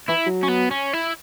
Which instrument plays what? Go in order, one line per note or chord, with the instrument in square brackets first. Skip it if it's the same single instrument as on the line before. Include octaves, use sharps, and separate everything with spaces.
[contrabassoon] E3 [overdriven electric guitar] E4
[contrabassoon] F#3
[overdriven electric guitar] C#4
B3
C#4
E4